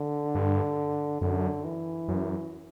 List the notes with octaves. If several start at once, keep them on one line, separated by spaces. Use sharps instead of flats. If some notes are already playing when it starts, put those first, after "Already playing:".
Already playing: D3
G2
F#2 D3
E3
F#2